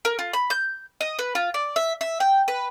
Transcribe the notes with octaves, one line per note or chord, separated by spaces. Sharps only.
A#4
F4
B5
G6
D#5
B4
F4
D5
E5
E5
G5
B4